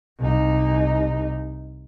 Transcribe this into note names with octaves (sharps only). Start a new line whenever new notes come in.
C2 D#4